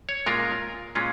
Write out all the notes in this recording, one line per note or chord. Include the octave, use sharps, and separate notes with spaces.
C#5
A#2 G#3 C#4 F4 A#4
A#2 G#3 C#4 F4